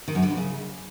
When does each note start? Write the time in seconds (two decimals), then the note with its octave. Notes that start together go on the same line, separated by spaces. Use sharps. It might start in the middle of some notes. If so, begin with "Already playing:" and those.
0.08 D#3
0.15 F#2
0.22 D3
0.30 F2
0.37 C#3